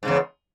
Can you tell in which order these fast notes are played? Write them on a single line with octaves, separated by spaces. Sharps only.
G#2 C#3 E2